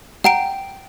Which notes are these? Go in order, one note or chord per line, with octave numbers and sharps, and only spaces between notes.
F#5 G5 A#5 D7